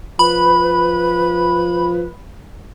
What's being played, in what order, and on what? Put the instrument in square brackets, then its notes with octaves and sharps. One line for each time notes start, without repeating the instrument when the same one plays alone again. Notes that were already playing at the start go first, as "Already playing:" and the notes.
[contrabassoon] F3 [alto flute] B4 [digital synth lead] B5